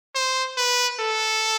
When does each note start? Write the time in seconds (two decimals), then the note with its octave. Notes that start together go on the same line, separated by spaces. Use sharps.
0.15 C5
0.57 B4
1.00 A4